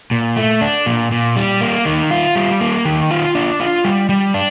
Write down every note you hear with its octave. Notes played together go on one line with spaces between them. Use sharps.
A#2
A3
D4
A#2
A#2
G3
A#3
D#3
F4
G3
A#3
D#3
F4
D4
F4
G3
G3
D4